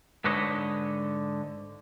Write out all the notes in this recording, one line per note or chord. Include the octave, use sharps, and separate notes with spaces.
G#2 D3 B4 C#5 D#5